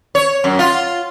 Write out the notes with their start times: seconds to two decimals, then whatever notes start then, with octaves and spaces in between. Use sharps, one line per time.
0.15 C#5
0.44 F#2
0.59 F4